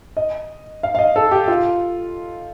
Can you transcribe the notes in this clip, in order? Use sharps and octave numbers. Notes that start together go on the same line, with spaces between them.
D#5
F5
F5
D#5
A4
G4
F4